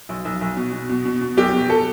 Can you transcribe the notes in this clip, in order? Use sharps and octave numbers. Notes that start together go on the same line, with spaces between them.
B1
B1
B1
B2
B2
B2
B2
B2
B1 G4
B2
A4